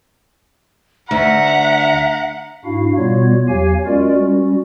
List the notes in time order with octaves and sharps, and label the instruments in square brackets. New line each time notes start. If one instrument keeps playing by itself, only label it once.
[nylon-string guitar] D2 [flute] E5 [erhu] F#5 [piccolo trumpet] A#5
[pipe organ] G#2 D4 E4 F#4 F5
B2 G3 B3 F4 F#4 C#5
E2 F#3 G4 C#5 F5 G#5
G#3 C#4 F4 F#4 A#4 D5
G3 C#4 F#4